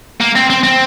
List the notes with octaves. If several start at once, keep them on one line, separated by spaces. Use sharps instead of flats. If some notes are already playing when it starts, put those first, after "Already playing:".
A#3
C4
C4
C4